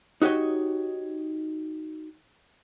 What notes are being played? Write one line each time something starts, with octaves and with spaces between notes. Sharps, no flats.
D#4 F#4 G4 C#5 D#5